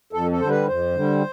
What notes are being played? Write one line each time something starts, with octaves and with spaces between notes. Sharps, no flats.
F2 A4
A4
D3 G3 C5
B4
F2 C5
D3 G3